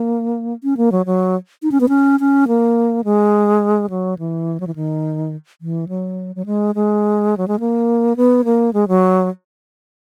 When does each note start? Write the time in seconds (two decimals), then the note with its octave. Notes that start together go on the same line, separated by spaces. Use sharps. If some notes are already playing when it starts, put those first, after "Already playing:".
Already playing: A#3
0.64 C#4
0.77 A#3
0.92 F#3
1.06 F#3
1.63 D#4
1.72 C#4
1.80 B3
1.89 C#4
2.20 C#4
2.48 A#3
3.04 G#3
3.90 F#3
4.19 E3
4.60 F#3
4.67 E3
4.75 D#3
5.61 E3
5.89 F#3
6.36 F#3
6.46 G#3
6.75 G#3
7.37 F#3
7.48 G#3
7.60 A#3
8.16 B3
8.45 A#3
8.73 G#3
8.88 F#3